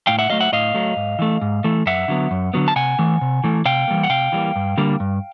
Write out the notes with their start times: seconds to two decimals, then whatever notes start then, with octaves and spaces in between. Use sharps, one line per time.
0.07 A2 F5 G5
0.19 E5 F#5
0.30 F#3 A3 D#5 F5
0.40 E5 F#5
0.52 A2 D#5 F5
0.74 F#3 A3
0.96 G#2
1.19 E3 A3
1.41 G#2
1.64 E3 A3
1.86 F#2 E5 F#5
2.08 D3 F#3 B3
2.31 F#2
2.54 D3 F#3 B3
2.68 A5
2.76 C3 F#5 G#5
2.99 E3 A3
3.21 C3
3.44 E3 A3
3.65 C3 F5 G5
3.88 E3 G3 A#3
4.03 F#5
4.10 C3 F5 G5
4.32 E3 G3 A#3
4.56 G2
4.77 D3 G3 A#3
5.00 G2